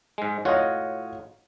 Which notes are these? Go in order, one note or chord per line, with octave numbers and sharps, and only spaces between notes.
G#2 G#3
A2 F4 F#4 C#5 D#5